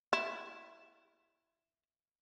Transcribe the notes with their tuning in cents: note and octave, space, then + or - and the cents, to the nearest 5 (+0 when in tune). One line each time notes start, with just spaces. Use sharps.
E4 +5